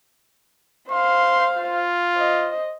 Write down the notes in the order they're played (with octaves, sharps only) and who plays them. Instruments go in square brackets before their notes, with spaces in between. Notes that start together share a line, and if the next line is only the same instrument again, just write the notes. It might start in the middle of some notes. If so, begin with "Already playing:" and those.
[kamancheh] C5 F5 [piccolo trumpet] C6
[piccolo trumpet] F4
[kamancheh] C5 D#5